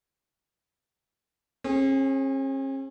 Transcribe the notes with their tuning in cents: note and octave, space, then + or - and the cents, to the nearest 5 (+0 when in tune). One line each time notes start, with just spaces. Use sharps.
C#4 -45 G#4 +0